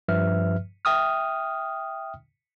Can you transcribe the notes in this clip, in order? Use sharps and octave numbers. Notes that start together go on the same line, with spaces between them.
G2 F3 B4 E5 F6
E5 G5 D#6 F6